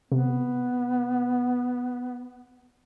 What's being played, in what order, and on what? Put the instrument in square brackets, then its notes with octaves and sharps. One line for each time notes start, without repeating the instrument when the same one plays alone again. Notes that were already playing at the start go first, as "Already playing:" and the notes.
[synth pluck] C3 [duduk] B3